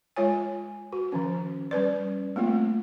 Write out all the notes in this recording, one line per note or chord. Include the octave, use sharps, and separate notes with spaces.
G#3 F4 C#5 G#5
F#4
D#3 F3 C#4
G3 C#4 B4 D5
A3 A#3 C4 F4